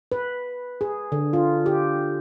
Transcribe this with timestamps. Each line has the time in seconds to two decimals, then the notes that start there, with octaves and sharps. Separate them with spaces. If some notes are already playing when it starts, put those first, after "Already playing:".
0.12 B4
0.81 G#4
1.12 D3
1.33 F4
1.66 G4